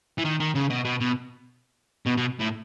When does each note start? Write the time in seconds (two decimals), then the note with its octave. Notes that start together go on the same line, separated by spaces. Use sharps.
0.18 E3
0.25 D#3
0.40 D#3
0.55 C#3
0.70 B2
0.85 B2
1.00 B2
2.06 B2
2.17 B2
2.40 A2